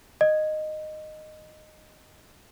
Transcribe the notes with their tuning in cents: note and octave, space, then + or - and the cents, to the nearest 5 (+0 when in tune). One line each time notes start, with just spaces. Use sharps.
D#5 -10